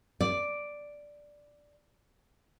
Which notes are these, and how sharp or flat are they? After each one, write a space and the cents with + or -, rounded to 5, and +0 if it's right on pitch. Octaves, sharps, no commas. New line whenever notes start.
D5 +0